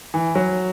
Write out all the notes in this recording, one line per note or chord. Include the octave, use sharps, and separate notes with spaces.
E3
F#3